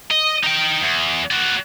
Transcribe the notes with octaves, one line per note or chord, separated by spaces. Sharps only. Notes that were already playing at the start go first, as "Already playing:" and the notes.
D#5
D#4 G5
E2
F#4 D5